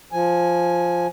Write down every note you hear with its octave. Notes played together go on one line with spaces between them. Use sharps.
F3 G#5